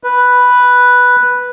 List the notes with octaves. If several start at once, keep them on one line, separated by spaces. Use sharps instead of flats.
B4